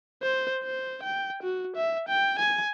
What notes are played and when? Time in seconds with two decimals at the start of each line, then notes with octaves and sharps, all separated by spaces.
0.22 C5
0.63 C5
1.03 G5
1.43 F#4
1.76 E5
2.08 G5
2.39 G#5